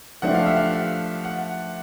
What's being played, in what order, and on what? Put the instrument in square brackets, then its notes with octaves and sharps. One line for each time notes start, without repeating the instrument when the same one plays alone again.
[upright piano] F3 A3 D4 G4 [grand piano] F#5
[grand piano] F5
E5
F5
F#5